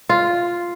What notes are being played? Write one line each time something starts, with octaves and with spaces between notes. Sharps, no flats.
F4